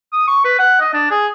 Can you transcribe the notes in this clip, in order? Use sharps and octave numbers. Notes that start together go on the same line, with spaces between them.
D#6
C#6
B4
F#5
D#5
D4
G#4